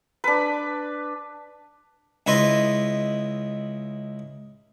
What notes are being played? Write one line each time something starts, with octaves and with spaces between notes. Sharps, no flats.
D4 B4
C#2 E4 B4 D#5 C6